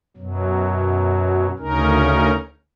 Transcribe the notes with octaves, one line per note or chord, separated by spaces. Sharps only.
F#2 B2 F#3
D2 C#3 C#4 D#4 A#4